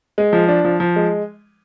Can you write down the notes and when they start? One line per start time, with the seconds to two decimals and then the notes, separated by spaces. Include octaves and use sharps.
0.18 G#3
0.33 F3
0.48 D4
0.65 F3
0.80 F3
0.96 G#3